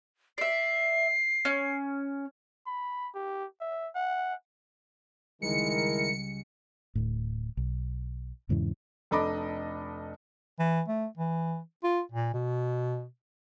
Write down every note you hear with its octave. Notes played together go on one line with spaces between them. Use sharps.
D5 E5 C7
C#4
B5
G4
E5
F#5
C#2 D#3 G3 G#3 E4 A#4 C#7
D1 A2
B1
E2 G#2 C#3 E3
F1 D4 A4 D#5 B5 D6
E3
A3
E3
F4
A#2
B2